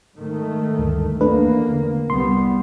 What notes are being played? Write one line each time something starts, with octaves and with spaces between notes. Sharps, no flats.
G#2 D#3 A3
D2 G2
E2 A3 A#3 D4 B4
D3
C2 G3 B3 C6